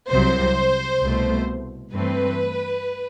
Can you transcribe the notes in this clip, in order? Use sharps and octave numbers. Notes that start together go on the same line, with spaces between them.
C2 C3 F#3 C5
C2 B2 A3
G2 E3 A3 C4 B4